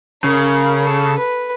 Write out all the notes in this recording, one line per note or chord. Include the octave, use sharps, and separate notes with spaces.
C#3 A#4
A4
B4